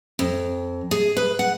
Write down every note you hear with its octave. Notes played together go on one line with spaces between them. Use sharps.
F2
G#4
B4
F#5